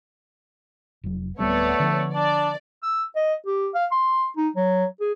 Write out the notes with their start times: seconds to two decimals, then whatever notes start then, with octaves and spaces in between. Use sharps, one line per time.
1.04 F1 F#3
1.39 D1 G3 A3 B3 C4 C#5 D5
1.80 D3 F3
2.15 D4 D5
2.83 E6
3.16 D#5
3.46 G4
3.74 F5
3.92 C6
4.37 D#4
4.56 F#3
5.01 G#4